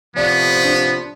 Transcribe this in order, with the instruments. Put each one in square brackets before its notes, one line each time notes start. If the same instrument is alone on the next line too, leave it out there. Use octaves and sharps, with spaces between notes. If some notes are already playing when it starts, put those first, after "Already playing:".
[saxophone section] A2 C3 F3 [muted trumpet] B3 [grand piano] D5
[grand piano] D4